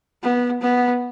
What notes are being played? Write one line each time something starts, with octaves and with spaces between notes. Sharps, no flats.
B3
B3